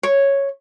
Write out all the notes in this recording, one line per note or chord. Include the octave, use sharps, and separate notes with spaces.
C#5